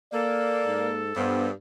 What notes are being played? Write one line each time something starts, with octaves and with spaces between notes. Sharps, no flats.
A#3 A4 D5
G#2
G2 B3 C5